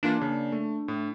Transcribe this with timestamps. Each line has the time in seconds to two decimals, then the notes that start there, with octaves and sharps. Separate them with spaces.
0.03 E3 A#3 D4 F4
0.20 C#3 A#3
0.52 A3
0.88 A2